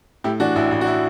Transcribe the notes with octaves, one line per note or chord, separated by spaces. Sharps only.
A2 E4 G4
E3 D4 F#4
A1 E4
A1 E4
F#4
E4